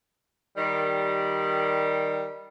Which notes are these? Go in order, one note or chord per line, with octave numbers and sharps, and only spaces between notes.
D#3 G3